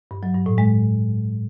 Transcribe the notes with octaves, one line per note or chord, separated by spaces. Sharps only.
G2
F#3
G2
A2
G#3